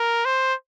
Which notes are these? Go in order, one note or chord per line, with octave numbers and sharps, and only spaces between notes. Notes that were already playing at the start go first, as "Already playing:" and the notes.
Already playing: A#4
C5